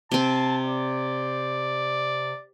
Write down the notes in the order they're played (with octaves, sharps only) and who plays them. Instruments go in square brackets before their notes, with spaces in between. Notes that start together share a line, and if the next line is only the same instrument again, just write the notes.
[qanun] C3 C4 [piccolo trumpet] A5
[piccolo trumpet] D5